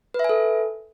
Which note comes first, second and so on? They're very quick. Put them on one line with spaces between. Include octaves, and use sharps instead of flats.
B4 E5 G#5 A4